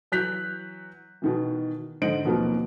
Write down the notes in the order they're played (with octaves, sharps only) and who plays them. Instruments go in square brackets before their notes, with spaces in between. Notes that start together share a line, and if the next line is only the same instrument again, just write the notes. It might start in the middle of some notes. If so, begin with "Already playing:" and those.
[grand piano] E3 F#3 F#6 G6 B6 F7
B2 D#3 E3
G#2 D3 C5 D#5 D7 F#7
D#2 B2 F3 F#3 A#3 C4